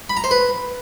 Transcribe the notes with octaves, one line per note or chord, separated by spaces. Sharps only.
B5
A#5
C5
B4